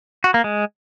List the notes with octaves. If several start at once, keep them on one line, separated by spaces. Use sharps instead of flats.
F#4
A#3
G#3